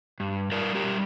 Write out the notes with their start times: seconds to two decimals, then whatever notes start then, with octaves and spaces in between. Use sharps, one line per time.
0.20 G2
0.52 G3 A#4 D5
0.75 G4 A#4
0.83 G3